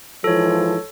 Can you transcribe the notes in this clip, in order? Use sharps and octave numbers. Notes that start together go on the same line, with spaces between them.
G#2 E3 F3 A4 C#5